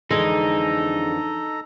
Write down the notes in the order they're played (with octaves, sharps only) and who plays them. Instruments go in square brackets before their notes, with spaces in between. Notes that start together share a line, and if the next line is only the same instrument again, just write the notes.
[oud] F2 D3 E3 [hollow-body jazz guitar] G#3 [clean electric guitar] D#4 [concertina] A4 A#5